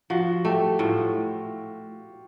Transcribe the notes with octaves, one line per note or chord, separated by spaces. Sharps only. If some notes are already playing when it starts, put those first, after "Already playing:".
F3 F#4
A3 G4
A2 F4